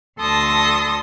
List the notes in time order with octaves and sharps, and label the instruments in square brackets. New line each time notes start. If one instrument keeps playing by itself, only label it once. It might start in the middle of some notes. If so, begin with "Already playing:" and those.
[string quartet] D2 A4 A5 C6 D#6 A#6